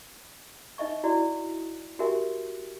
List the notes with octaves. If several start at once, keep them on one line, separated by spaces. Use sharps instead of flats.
D#4 D#5 E5 C#6
E4 F#4 D5
F#4 G4 A#4 E5 G#5